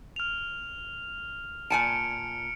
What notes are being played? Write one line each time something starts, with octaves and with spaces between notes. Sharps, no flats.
F6 F7
A#2 G#5 A5 F6 C#7 D7